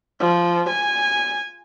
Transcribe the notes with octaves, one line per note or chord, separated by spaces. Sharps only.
F3
G#5